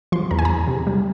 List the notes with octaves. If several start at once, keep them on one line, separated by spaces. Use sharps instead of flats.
F3 C6
E2 A#5
G#5
E2 A#5
C3
G3